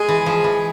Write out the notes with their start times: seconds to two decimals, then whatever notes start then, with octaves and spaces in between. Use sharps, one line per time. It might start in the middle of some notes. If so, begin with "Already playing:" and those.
Already playing: G#3 G#4
0.08 E3
0.26 F3
0.44 E3